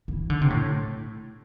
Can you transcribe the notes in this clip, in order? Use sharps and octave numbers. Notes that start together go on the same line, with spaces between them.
E3
D3
C3
A2